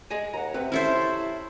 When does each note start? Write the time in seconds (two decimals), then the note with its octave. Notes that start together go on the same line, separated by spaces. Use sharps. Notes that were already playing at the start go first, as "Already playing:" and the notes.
0.10 G#4 D#5 G#5
0.33 D#2 F#5 A#5
0.54 C3 C4 B4
0.72 C#4 E4 A4 C5 E5